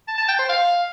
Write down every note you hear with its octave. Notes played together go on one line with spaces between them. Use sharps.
A5
A5
G5
C5
F5